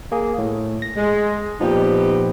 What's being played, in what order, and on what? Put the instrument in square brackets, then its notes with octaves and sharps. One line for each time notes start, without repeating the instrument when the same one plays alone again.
[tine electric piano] A#3 G#4
A2
A#6
[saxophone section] G#3
[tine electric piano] A#2 F3 [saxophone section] B3 D#4 G4